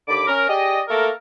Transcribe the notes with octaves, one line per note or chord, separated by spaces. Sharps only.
D#2 D3 B5 D6
C#4 A#4
G4 G#4 D5 D#5
A3 A#3 A4 A#4